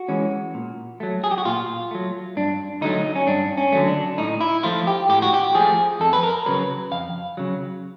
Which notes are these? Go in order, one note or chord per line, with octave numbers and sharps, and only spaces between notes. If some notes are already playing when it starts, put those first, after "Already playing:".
Already playing: F#4
E3 G#3 C#4
A#2
F#3 A3
G#4
G4
F#4
A#2 F4
F#3 A3
G2 D4
D3 F#3 A3 D#4
C#4
G2 D4
C#4
D3 F#3 A3
D4
A2 D#4
E4
F3 A3 F4
G4
A2 G4
F#4
G4
F3 A3 G#4
F2 A4
B4
A#4
C#3 F#3 B4
F2 F5
C#3 F#3